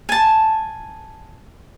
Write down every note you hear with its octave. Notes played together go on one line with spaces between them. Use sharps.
G#5 A5